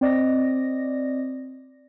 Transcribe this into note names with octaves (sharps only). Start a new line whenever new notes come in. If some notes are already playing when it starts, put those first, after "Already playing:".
C4 D5 D#5 A#6